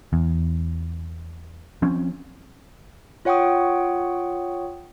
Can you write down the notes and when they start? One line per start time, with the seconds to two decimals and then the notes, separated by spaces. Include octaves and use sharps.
0.13 E2
1.82 F3 C4 C#4
3.25 F4 C#5 F#5 G5 C#6 D#6